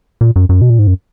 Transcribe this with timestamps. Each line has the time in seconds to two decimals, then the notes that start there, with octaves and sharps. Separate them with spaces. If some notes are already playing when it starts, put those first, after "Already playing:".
0.21 A#2
0.36 F#2
0.49 F#2
0.61 B2
0.70 A#2
0.79 G#2
0.87 F#2